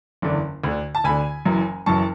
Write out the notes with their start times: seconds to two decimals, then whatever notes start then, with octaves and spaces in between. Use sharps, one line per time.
0.22 F#1 E2 D3
0.64 D2 D3
0.95 A5
1.04 D2 D3 G#5 B5
1.46 F#1 F#2 E3
1.86 F#1 F#2 E3 A5 C#6